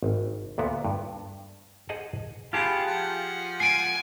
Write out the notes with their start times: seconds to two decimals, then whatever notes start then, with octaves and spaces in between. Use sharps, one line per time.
0.03 G#1
0.58 D2 A#2 B3 F#4
0.85 G2
1.89 G#4 C5 D#5 F#5 A5
2.53 F4 G4 G#4 F#5 A5 B5
2.87 F3 F#5
3.60 G#5 C7 D7